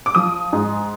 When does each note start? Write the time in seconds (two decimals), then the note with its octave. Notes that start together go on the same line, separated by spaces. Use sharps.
0.06 D6
0.15 F3 D#6
0.53 G#2